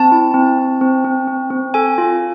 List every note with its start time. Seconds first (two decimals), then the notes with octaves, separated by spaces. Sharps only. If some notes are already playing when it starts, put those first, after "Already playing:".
Already playing: C4 A5
0.12 E4
0.34 C4
0.58 C4
0.81 C4
1.05 C4
1.28 C4
1.51 C4
1.74 A4 G#5
1.98 F4